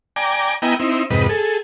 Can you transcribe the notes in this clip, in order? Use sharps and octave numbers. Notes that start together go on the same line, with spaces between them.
D5 G5 G#5 A#5 D6
B3 E4 D#5 G5 G#5 A#5
C4 D#4 E4
F2 G#2 C3 B4 D#5
G#4 A4